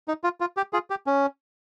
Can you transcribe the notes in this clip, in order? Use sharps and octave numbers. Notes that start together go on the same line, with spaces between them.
D#4
F4
F4
G4
F4 G#4
G4
C#4